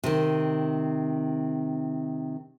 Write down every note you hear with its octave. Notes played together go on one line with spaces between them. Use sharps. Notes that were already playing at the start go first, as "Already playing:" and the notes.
C3 D#3